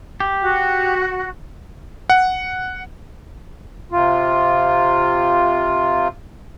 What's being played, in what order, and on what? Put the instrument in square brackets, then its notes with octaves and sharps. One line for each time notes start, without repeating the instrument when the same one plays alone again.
[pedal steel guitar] G4
[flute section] F#4
[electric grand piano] F#5
[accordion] C3 F4